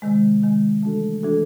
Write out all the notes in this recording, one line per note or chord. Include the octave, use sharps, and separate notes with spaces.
C3 D#3 G#3
C3 D#3 G#3
E3 A3 D4 F#4 A4
E3 A3 D4 F#4 A4